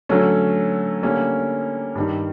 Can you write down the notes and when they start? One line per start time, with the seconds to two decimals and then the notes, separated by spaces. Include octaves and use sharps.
0.09 D3 F#3 A3 C#4
1.03 D3 G3 A#3 C#4
1.95 G2 D#3 G3